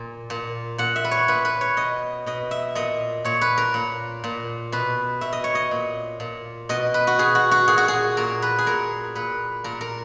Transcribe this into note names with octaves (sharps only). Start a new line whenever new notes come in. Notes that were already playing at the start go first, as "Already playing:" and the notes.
Already playing: A#2
A#2
A#2 F#5
E5
B4
C#5
A#2 B4
B4
C#5
B2 D#5
B2 D#5
E5
A#2 D#5
A#2 C#5
B4
A#4
A#2
A#2
B2 B4
B2 E5
D#5
C#5
D#5
A#2
A#2
B2 D#5
B4
F#4
B2 G#4
F#4
F#4
A#2 G#4
F#4
G#4
A#2 A#4
B4
G#4
A#2 A#4
A#2 B4
A#2 A#4
A#4